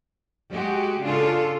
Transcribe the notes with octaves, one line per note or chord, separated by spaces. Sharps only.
G#3 F#4 G4
C#3 D4 F4 A4